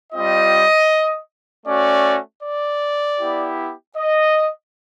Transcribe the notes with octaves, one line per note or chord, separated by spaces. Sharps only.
G3 C4 F4 D#5
A3 C#4 F#4 D5
D5
B3 E4 G4
D#5